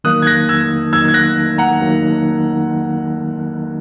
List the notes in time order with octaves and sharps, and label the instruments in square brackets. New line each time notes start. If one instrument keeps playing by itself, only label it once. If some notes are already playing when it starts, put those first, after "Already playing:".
[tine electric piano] D#3 F#3 A#3 D#4 [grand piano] D#6 F#6
[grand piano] G#6
F#6 A#6
E6 G#6
[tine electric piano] D#3 F#3 A#3 D#4 [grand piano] E6 G#6
[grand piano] G#6
F#6 A#6
F#5 A#5
[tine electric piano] D#3 F#3 A#3 D#4